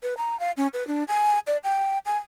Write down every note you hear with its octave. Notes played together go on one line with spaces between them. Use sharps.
B4
A#5
F5
C#4
B4
D4
G#5
D5
G5
G#5